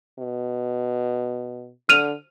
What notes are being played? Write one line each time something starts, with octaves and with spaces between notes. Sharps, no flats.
B2
D3 F6 D#7 F7